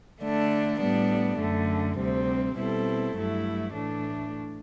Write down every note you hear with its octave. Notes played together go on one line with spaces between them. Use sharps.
D3 A3 D4
A2 G3 B3 D4
F#2 D3 A3
D2 C3 G3 C4
B2 G3 C4 E4 A4
G2 F#3 A3 E4
A2 E3 A3 D4